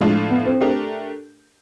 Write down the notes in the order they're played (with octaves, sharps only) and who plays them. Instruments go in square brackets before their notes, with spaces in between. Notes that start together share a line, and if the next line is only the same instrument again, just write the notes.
[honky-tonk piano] A2 F3 A3 D4 F4 [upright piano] G#3
[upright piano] B3
C4
[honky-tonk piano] A3 D4 G4 A#4